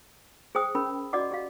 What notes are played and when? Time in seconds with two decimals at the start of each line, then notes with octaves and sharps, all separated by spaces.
0.55 G#4 C5 G5 D#6
0.75 C#4 A#4 B5
1.13 F#4 D5 D#5 F#5 D6
1.31 G4 D#5 F5